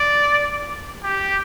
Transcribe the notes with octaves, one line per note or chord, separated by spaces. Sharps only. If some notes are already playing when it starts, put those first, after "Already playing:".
Already playing: D5
G4